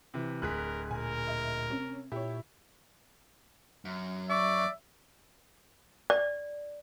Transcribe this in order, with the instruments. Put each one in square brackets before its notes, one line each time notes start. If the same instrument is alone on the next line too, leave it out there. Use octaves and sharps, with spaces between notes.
[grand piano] C3 E3
[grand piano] D1 G#4 [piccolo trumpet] A#4 [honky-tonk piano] F#6 B6
[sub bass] A#2 [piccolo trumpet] A#4 [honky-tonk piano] G#5
[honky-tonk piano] D#5 E5
C3 C#4
[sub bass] A#2 [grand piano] E4 [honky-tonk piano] G4 C#5
[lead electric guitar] F#2
[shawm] D5 [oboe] E5 [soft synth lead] C#6
[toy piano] D5